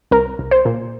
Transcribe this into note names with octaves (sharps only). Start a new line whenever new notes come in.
C2 A#4
C2
C5
A#2